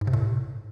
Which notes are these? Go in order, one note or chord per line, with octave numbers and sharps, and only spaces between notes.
G#2
C3
A2